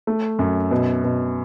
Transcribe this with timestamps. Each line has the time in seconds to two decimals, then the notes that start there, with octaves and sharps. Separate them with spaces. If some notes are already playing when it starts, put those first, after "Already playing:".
0.07 A3
0.39 F#2
0.71 B2
1.04 B2